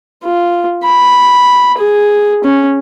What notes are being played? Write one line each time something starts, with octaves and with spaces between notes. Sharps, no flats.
F4
B5
G#4
C#4